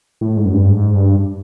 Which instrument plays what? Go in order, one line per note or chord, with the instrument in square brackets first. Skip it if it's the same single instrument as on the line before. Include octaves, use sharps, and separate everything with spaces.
[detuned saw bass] A2
G#2
F#2
G2
G#2
G2